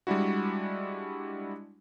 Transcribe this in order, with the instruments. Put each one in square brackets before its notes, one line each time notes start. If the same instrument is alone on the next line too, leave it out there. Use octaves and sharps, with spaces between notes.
[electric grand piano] G3 G#3 D4 E4 F#4